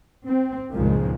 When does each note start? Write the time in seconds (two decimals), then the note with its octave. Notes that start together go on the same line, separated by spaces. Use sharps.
0.24 C4
0.74 C#2 G2 A#2 D#3 F3 G#3